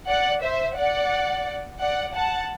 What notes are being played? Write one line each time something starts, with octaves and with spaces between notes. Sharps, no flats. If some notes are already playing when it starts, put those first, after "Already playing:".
D5 F#5
C5 E5
D5 F#5
D5 F#5
F#5 A5